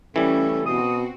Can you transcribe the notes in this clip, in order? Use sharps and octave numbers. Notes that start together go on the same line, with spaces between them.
C#3 E3 G3 A3 C#4 A4
B2 C4 F#4 D#6